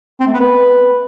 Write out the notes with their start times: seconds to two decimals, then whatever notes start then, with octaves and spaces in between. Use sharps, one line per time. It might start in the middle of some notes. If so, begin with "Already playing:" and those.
0.20 C4
0.27 A3
0.33 B3
0.40 B4